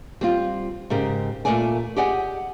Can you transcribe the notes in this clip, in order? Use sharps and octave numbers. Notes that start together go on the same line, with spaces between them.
G3 C4 F4
G#2 C#3 G4 A#4
A#2 G3 A3 A#4 D5 G#5
G4 G#4 D5 D#5 F#5 G#5